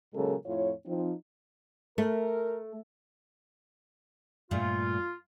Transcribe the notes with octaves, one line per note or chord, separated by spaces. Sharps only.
A#2 C#3 F#3 G#3 A4 A#4
F2 A2 F4 C#5
F3 C4 D#4
A3 A#4
G2 A#2 A3 F4